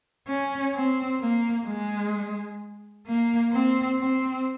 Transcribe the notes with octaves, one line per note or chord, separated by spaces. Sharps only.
C#4
C4
A#3
G#3
A#3
C4
C4